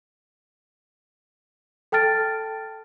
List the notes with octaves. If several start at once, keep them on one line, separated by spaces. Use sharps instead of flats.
A4 G5 A5 F6 A6 D7